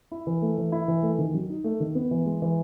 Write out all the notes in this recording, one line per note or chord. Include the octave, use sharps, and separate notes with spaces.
E4
E3
A3
E3
E4
E3
A3
D#3
F#3
D#4
A3
D#3
B3
E3
G#3
E3